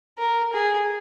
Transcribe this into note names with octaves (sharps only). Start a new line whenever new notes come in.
A#4
G#4